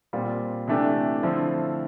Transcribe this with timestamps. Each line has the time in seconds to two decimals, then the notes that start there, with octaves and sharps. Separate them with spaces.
0.13 A#2 G3 C4 F4
0.68 C3 E3 A3 D4 G4
1.23 D3 F3 A3 C4 E4